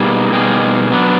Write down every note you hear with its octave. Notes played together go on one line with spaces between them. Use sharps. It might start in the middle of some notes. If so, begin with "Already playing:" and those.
Already playing: B2 G3 A#3 D#4 G#4
B2 G3 A#3 D#4 G#4
F#3 B3 D4